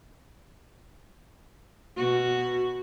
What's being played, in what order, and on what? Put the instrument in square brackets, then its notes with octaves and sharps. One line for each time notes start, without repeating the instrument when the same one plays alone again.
[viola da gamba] B2 F#4